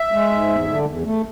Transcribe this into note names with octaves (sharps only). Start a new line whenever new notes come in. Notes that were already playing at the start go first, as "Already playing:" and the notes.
Already playing: E5
G#3
G#2
E2
D3
E2
A3